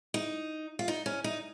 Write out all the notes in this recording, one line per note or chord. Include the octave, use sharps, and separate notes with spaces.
D#4
F4
D#4
C#4
D#4